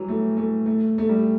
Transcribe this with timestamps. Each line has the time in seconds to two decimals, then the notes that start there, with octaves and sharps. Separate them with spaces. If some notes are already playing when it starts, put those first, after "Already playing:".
Already playing: E3 F#3 G3
0.08 A3
0.37 A3
0.66 A3
0.98 A3
1.09 G3